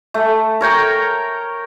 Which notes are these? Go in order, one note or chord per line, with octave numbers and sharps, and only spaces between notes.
A3
A#4 C#5 G5 A#5